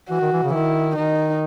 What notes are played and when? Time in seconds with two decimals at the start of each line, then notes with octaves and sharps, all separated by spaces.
0.10 E3 F#4
0.21 D#3
0.32 E3
0.43 C#3
0.50 E3
0.53 D#3 E4
0.96 D#3 D#4